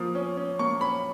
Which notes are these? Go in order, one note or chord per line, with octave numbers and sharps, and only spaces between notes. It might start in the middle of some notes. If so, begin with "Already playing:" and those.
Already playing: F3 A#3 D#6
C#4
C#4
A#3 C#6
C#4 B5